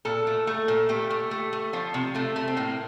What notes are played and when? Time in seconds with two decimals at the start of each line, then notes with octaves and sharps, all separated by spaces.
0.05 A#2 A4
0.27 A3
0.47 A3
0.68 A#2
0.89 A3 G4
1.10 A3
1.31 A3
1.53 A3
1.73 F3 F4
1.94 C3
2.15 C3 A3
2.36 A3
2.48 C4
2.57 A2 A#3